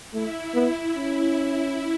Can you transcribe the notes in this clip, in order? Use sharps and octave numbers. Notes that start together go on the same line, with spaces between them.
A3 E4
B3
C#4